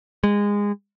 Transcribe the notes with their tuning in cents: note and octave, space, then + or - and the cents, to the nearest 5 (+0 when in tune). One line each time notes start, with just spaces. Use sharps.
G#3 -20